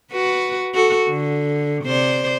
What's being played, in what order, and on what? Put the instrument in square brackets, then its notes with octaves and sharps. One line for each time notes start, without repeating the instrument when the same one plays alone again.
[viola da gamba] F#4 B4
F#4 A4
D3
C3 C5 D5